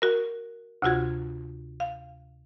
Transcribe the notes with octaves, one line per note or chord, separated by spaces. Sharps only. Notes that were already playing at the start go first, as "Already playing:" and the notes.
F#4 A#4
D2 C3 F4 F#4 G#6
F5